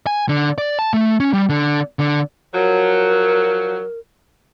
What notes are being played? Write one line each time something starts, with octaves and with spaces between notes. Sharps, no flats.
G#5
D3
D5
A5
A3
C#4
G3
D3
D3
F3 F#3 A#4